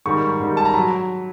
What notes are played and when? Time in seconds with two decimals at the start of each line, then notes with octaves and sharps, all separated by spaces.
0.06 G#2 D#3 G3 C#6
0.40 G#2 D#3 G3
0.57 A5
0.65 A#5
0.74 F#3 B5